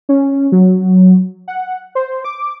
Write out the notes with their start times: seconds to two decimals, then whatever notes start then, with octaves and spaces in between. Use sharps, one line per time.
0.09 C#4
0.52 F#3
1.48 F#5
1.95 C5
2.25 D6